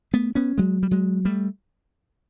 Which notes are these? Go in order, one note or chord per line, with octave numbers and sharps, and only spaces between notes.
A3 B3
B3 C#4
F#3 G#3
G3
F#3 G#3
G3 A3